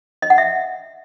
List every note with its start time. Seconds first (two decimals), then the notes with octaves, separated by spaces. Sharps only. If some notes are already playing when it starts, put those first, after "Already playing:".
0.22 D#5
0.30 F#5
0.38 E5